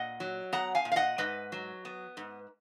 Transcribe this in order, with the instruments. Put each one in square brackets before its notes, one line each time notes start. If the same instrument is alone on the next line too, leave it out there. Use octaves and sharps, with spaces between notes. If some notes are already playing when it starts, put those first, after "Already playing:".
Already playing: [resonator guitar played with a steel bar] A#2 D#5 F#5
F#3
B3 F#5 A#5
F5 G#5
A#2
F5
D#5 F#5
G#2 B4 D#5
F#3
B3
G#2